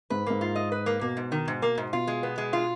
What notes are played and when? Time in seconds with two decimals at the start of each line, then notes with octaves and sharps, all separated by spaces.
0.10 G#2 B4
0.26 G#2 A#3
0.41 F4
0.56 D#5
0.72 B4
0.86 A#3
1.01 B2 A#3
1.17 G#2
1.32 D#3
1.48 G#2
1.62 A#3
1.78 G#2
1.93 B2 F4
2.07 G#3
2.23 B3
2.38 G#3
2.53 F4